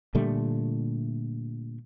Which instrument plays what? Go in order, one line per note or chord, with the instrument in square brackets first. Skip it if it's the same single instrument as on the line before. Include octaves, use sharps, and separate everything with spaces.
[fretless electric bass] A#2 D3 G3 A3